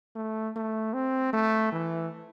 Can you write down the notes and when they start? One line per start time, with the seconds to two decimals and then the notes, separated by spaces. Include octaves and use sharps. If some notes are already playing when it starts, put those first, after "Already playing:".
0.16 A3
0.56 A3
0.94 C4
1.33 A3
1.73 E3